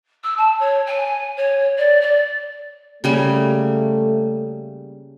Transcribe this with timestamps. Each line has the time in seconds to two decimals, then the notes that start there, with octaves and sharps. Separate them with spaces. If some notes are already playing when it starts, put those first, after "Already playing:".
0.24 E6
0.37 A5
0.59 C#5
0.86 G#5
1.36 C#5
1.78 D5
2.01 D5
3.04 C#3 G3 A3 A#3